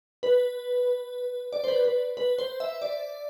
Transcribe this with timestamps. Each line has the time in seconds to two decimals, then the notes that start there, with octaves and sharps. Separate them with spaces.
0.23 B4
1.53 D5
1.64 C5
1.68 B4
1.84 B4
2.17 B4
2.39 C5
2.60 E5
2.82 D5